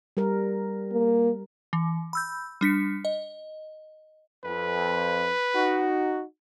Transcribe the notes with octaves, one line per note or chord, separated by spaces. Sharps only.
G3 A#4
A#3
E3
B5 E6 G6
G3 D4 B6 C#7
D#5
F2 B4
D#4 F#4